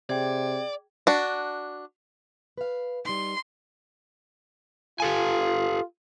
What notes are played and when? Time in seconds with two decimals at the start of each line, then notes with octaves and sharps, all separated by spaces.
0.10 C3 G#4 D5 G5 G#6
1.07 D4 F#4
2.58 B4 F5
3.05 G3 D#4 C6
5.00 F4 G4 A4 G#5